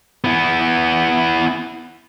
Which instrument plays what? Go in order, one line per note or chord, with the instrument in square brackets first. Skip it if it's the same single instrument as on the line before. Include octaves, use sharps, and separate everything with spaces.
[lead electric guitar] B3 E4